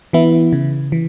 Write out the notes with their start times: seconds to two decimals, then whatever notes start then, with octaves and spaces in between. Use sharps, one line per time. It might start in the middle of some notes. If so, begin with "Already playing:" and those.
0.13 E3 B3 E4
0.53 C#3
0.92 E3